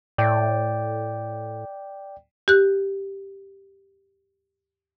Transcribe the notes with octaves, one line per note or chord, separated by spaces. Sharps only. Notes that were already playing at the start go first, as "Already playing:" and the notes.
A2 D5 G5
G4 F#6